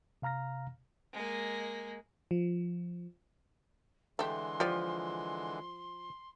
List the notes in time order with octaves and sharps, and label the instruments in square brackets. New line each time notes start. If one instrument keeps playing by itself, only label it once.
[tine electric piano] C3 F5 A#5 F6 A#6
[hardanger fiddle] G#3 A#3
[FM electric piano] F3
[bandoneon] D3 E3 G#3 [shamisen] A3 G4 [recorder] C6
[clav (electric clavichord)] F3 [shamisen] G4 D5